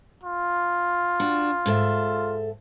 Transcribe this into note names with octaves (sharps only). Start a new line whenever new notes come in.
F4
D4 F#4
G#2 A4 E5